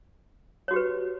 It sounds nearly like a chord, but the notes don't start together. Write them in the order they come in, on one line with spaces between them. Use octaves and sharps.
C#5 F#4 G4 B4